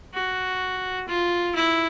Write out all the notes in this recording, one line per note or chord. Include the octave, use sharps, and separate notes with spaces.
F#4
F4
E4